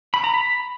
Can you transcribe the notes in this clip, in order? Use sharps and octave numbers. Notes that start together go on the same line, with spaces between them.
B5
A#5
B5